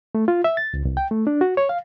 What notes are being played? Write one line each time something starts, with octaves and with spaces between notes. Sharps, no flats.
A3
F4
E5
A6
C#2
C2
G5
A3
D4
F#4
C#5
F5